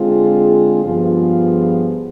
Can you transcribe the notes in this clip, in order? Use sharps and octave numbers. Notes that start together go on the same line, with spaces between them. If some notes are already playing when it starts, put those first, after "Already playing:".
Already playing: D3 G#3 C4 F4 G#4
G2 F3 B3 F4 G#4